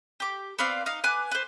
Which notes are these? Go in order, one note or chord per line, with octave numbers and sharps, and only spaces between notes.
G4 D6
B3 C4 D5 F5
D#4 F5
B4 G#5 D6 F#6
B4 C5